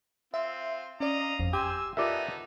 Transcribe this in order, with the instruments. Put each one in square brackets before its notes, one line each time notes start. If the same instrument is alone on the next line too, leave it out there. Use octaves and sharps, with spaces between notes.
[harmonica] C4 F4 [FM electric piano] E5
[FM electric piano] C#4 D5 [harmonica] D#5 F5 A#5
[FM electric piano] G1 F2
[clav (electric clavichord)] G4 [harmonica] G#5 C6 E6 [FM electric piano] G6
[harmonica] B3 D#4 A4 [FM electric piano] F4 G4 A#4 [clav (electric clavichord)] D5 E5